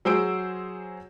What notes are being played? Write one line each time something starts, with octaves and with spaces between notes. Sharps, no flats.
F#3 G#4 C5 E6 D7